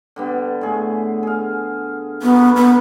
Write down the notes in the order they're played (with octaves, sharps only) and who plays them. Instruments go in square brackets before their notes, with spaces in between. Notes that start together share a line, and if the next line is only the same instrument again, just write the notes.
[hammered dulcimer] D3 G3 B3
A2 G#4
G#4 F5
[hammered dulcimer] F#2 A#4 [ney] B3
[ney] B3